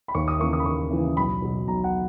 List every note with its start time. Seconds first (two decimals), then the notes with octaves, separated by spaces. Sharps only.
0.08 B5
0.15 D#2 C#6
0.28 D#6
0.40 C#3 E3 A#3 C#6
0.53 D#6
0.60 B5
0.66 D#2 C#6
0.91 C#3 E3 A#3
1.17 B1 B5
1.42 B2 F#3
1.68 B1 A#5
1.84 F#5